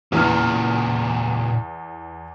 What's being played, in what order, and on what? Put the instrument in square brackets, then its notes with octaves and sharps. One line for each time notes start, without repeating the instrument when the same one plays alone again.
[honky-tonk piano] E2 E3 F6 [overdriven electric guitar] A#2 C#3